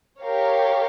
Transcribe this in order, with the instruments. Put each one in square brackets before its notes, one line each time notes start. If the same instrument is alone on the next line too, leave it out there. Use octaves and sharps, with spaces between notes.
[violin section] G4 A#4 C#5 F5